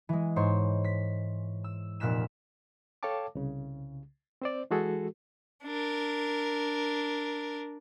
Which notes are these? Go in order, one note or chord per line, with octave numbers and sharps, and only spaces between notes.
E3 G#3
G#2 C5 C#5 C6
B6
E6
F1 A#2 F6 F#6 B6 E7
A4 C#5 F5 G5 A5 D6
C2 C#3
C4 C5 D5
E3 G#3 F#4 G#4 A4
D4 A#4